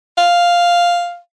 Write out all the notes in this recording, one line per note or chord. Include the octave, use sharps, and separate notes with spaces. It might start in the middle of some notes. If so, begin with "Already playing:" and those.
F5